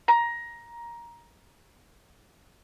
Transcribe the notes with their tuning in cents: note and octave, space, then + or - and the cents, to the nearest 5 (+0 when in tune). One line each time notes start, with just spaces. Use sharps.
A#5 +15